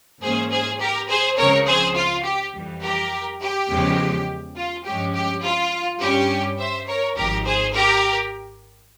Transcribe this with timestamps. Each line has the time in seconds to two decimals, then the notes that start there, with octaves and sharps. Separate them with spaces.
0.22 G#2 E3 A#3 C#4 G#4 C5
0.51 G#4 C5
0.80 G4 A#4
1.09 G#4 C5
1.37 C#2 C#3 F3 C4 A#4 C#5
1.67 G#4 C5
1.96 F4
2.24 G4
2.53 F2 E3 G3
2.82 G4 A#4
3.40 G4
3.69 E2 C#3 F3 G#3
4.56 F4
4.85 G2 F3 G#3 C#4 G4
5.14 G4
5.43 F4
6.00 G2 G3 C#4 G4
6.59 C5 E5
6.87 A#4 C#5
7.16 G#1 G#2 F3 G4 A#4
7.45 G#4 C5
7.74 G4 A#4